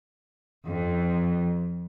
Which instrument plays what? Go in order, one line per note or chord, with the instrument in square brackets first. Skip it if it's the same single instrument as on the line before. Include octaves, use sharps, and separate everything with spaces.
[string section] F2